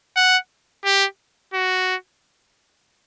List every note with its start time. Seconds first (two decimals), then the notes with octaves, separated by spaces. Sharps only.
0.16 F#5
0.85 G4
1.54 F#4